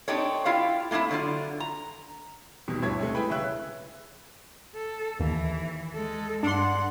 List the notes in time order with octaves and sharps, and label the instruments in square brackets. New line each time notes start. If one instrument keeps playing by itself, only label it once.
[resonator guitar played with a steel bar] C4 D4 D#4 G4 A4 C#5
E4 F4 G4 F5
A3 A#3 C4 D#4 E4
D3 F#3 F4
A#5
[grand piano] D#1 B2 D#3
D2 G2 E4 C#5 G#6
C3 G#3 A3
E4 G#4 B4 G5 B5
D#1 C#3 B4 C#5 E5 F#6
[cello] A4
[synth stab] D#2 [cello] E3
[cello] G#3 A4
[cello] G2 F#5 [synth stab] D4 C6